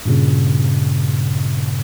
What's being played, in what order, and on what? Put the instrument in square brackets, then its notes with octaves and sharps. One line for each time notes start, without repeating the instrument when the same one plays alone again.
[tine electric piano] G2 A#2 C#3